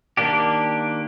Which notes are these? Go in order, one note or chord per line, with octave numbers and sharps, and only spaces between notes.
D#3 A#3 D4 G4